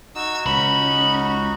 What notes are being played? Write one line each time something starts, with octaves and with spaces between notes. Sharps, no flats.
D#4 F#4 E6 G#6
C#2 C#4 B5